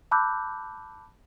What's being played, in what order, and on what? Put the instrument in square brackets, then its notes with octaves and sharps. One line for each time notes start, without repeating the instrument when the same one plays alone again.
[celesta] A5 B5 D6 E6 F#6 G6